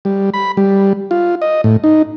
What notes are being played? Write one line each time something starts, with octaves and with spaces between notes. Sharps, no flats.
G3
B5
G3
F4
D#5
A2
D#4